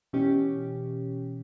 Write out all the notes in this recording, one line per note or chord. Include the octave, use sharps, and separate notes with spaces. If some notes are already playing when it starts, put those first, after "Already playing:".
B2 E3 C#4 G4